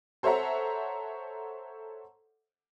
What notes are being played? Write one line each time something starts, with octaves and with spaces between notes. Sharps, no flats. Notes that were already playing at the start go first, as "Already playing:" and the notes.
A4 C5 C#5 E5 F#5 A#5